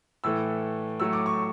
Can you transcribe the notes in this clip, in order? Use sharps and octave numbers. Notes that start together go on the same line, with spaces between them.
A2 E3 A3 E6
A2 F#3 A3 E6
D6
C#6